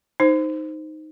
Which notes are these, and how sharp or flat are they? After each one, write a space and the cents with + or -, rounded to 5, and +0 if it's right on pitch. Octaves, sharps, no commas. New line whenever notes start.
D#4 +0 C5 -5